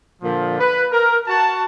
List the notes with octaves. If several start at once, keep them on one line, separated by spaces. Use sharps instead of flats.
A#2 D3 F3
B4
A#4
F#4 A5